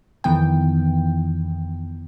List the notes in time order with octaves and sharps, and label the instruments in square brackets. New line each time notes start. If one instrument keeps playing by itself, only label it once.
[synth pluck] F2 D#3 E3 B3 G5